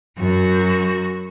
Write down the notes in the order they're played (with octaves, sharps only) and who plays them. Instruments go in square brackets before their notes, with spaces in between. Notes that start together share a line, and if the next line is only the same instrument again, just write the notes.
[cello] F#2 F#4